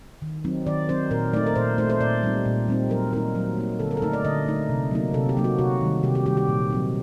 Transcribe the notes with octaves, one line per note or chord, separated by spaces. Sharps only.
D#3
F#3 C4 D#4
D#3 D5
F#3 C4 D#4 C5
A#2 A#4
A3 D#4 D5
A#4
A#2 C5
A3 D#4 C5
C5
A#2 D5
G3 C4 D#4
A#2
G3 C4 D#4
F#3 A#4
A#3 D#4 A#4
F#3
A#3 D#4
D3 A4
A#4
A4
A3 D#4 A#4
D5
D3 D#5
A3 D#4
C3
F#3 A#3 D#4
C3 A4
G4
F#3 A#3 D#4
F#4
C3 F#4
D#3 G3
C3 G4
G4
D#3 G3 G4
G4
A#2
F#3 C4 D#4